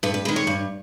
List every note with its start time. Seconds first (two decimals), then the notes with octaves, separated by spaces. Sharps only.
0.03 G2 B4
0.14 B4
0.25 G#3 B4
0.28 D#3
0.36 C#5
0.47 G2